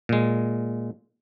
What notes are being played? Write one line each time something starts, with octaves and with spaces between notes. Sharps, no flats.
A#2 G#3